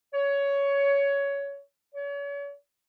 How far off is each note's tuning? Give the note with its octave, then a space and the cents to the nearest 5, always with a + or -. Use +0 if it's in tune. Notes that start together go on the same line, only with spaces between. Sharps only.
C#5 +15
C#5 +40